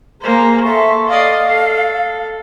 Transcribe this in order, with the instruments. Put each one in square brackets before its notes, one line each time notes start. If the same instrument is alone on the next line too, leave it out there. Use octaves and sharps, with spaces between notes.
[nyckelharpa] A#3 C5 [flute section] G#4 A#5
[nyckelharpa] A4 [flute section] E5 C6 C#6
[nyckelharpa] D5 D#5 [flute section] F5
[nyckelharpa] A4